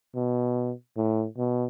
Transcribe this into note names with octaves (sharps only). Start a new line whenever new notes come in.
B2
A2
B2